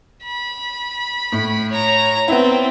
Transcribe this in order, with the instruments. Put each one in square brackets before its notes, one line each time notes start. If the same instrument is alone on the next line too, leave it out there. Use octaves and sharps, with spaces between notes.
[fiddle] B5
[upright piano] A2
[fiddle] C#5 A#5
[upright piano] B3 E4 [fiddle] C4